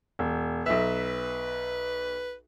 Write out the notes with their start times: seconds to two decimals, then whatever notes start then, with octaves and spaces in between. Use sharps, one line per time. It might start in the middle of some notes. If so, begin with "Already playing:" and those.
0.19 E1
0.66 B1 B4 E5